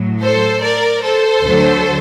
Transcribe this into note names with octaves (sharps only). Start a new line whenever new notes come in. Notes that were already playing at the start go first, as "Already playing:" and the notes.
Already playing: A2 F#3
A4 C5
A#4 D5
A4 C5
D2 D3 F#3